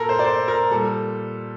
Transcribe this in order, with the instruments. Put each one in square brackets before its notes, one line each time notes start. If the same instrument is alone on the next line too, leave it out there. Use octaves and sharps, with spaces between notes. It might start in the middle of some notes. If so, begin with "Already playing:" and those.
Already playing: [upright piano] A#2 A4 A#4
C5
D5
C5
A#4
A#2 G3 A4